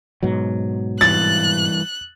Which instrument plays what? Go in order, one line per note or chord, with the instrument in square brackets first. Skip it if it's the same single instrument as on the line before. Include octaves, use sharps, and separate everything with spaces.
[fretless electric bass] G#2 B2 F#3
[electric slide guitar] G2 E3 [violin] F#6 [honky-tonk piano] A6